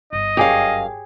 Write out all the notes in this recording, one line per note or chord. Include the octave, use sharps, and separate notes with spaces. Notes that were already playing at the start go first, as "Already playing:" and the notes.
G1 D#5
F#2 G4 G#4 C#5 F5